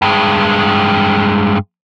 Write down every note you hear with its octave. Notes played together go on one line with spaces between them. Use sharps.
G2 G#3